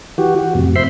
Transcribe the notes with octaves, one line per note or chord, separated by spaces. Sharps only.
E3 F#4 G4
F#4
F2 A2 C3
C5 E5 B5 C6